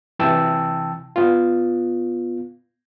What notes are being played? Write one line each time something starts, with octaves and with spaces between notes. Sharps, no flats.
C3 E3 G5 A5 E6
B3 F4